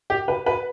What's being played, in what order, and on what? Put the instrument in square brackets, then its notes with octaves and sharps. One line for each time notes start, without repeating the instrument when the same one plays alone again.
[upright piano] G4
B4
B4